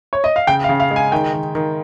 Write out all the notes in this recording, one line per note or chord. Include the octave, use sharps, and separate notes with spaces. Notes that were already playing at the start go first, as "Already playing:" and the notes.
C#5
D#5
F5
C#3 G5
F5
C#3
F5
G#3
G#5
D#3 G5
D#3
D#3